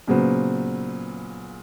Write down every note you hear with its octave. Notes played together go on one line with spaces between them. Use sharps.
A#2 C#3 F#3 B3 C5